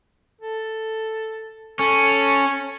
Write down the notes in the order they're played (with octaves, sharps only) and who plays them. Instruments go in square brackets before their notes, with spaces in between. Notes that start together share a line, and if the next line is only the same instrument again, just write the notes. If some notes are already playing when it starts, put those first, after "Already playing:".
[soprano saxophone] A4
[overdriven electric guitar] C#4 [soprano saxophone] A4